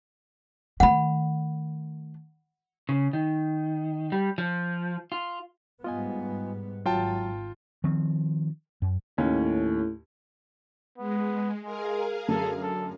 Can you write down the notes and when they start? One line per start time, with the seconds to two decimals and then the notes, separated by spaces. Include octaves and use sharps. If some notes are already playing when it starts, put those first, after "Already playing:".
0.80 D#3 A3 F#5 B5
2.89 C#3
3.13 D#3
4.12 G3
4.38 F3
5.12 F4
5.84 G#2 G3 B3 F4 D#5 G#5
6.86 G#1 F#3 F4 G5 A5
7.84 D#3 F3 C4
8.82 F#2
9.18 D#2 A2 C#4
10.98 G#3 B3
11.64 G#3 G#4 A#4 F5
12.28 F#2 D3 A3 A4
12.63 A4